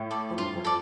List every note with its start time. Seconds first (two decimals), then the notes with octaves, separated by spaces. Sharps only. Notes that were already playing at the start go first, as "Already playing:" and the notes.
Already playing: A2
0.11 A4 D5
0.30 F2
0.38 G2 F4
0.55 F2
0.65 A4 D5